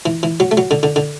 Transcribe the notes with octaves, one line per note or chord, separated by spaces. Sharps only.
E3
E3
F#3
A3
F#3
D3
D3
D3